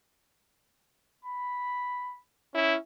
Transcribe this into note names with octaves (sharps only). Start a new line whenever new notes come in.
B5
C#4 E4